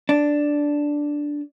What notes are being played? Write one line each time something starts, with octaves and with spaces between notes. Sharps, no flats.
D4